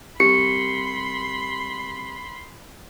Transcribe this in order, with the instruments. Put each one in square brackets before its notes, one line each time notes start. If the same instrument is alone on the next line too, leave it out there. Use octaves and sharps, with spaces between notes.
[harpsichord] C2 [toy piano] G4 [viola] B5 C6 [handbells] C#7